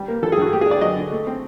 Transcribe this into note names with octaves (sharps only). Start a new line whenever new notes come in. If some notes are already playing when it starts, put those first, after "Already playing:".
Already playing: G3
A#3
E3 A4
G#4
G2 F#4
A3 G4
G#4
D4 D5
F#3 D#5
D3
A3
C4